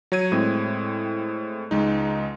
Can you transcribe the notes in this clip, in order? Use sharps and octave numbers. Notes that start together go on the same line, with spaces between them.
F#3 C#5 G#6 D#7
A2 G#3 C4
C#2 G#3 D#4